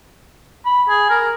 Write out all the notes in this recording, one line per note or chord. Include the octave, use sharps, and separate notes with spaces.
B5
G#4
A#4